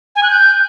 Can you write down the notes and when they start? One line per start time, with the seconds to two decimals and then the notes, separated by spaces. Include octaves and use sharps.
0.16 G#5
0.23 F#6
0.31 G6